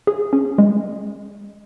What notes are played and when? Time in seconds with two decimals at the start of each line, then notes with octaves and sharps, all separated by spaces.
0.07 G#4
0.33 C#4
0.58 G#3